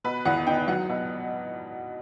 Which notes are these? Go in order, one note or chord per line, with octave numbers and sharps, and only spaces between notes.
B2 B4
E2 F#5
D#4 G5
F#3 F#5
B2